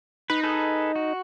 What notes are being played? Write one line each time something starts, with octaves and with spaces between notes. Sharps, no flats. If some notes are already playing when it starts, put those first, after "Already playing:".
D#4 B4
G#4 A4 B4
F#4